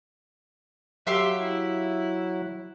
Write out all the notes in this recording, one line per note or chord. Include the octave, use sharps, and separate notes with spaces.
F#3 G4 E5 F5 C6
E4